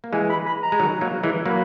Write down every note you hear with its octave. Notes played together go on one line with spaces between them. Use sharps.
A#3
E3 G#3 G#5
B5
B5
A#5
G#3
D#3 F#3
F#3 A#3
E3 G#3
F#3 A#3 B5